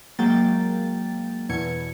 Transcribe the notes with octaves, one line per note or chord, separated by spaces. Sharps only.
F#3 G#3 A#3 G5 A6
E2 B2 G#6 C#7